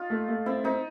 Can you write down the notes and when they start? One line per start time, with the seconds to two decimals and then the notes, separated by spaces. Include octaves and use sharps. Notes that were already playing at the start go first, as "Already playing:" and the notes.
Already playing: D#4 F4
0.10 A3
0.28 A3
0.46 C4 E4
0.64 C4 D#4